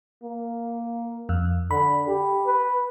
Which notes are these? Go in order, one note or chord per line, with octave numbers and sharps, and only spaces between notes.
A#3
F2
D3 B5
G4
B4